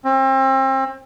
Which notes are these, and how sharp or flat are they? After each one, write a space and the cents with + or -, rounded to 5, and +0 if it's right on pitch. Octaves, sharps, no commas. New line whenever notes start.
C4 +35